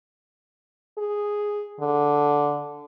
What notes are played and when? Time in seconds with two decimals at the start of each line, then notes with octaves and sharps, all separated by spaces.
0.98 G#4
1.80 D3